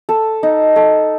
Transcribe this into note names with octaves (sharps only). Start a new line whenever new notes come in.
A4
D#4
A4